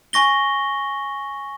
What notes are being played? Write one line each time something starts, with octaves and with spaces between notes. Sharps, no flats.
G#5 C#6 A#6 G7